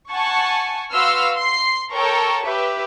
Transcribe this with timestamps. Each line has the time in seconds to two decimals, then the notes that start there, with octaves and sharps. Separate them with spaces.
0.10 F#5 G#5 A5 C#6
0.92 F#4 B4 F5 C6 E6 F6
1.36 C6 C7
1.92 A4 A#4 C#5 G5 A5 C#6
2.44 G4 B4 E5